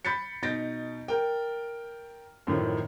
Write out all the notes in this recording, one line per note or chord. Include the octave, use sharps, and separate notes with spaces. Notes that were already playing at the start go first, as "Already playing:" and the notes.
B5 G6 A6 B6 C#7
B2 D#4 G6 A6 A#6 D7
A#4 G5
F#2 A2 D#3 F3